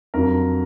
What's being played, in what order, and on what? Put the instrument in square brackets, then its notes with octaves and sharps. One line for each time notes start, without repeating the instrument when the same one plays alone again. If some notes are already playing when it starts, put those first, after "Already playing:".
[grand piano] F2 D3 F#3 A#4